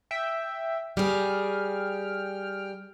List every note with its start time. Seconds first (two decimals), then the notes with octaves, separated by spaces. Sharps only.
0.11 E5 G5
0.97 G3 G#4 G5 F6